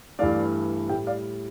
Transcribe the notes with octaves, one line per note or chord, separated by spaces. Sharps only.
G2 E3 A3 D5 F5
A2 G3 E5 G5
D5 F5